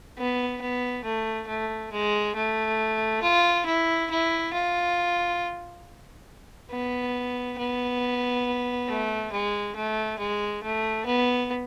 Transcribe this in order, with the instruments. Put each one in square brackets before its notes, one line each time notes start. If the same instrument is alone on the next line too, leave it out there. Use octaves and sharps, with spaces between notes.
[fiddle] B3
B3
A3
A3
G#3
A3
F4
E4
E4
F4
B3
B3
A3
G#3
A3
G#3
A3
B3